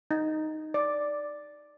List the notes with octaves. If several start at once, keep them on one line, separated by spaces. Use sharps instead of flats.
D#4
D5